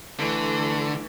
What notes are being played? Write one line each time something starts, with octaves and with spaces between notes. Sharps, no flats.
D3 E3 A3